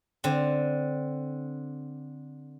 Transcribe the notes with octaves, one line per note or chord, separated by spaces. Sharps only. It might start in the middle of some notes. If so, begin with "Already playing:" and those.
D3 C4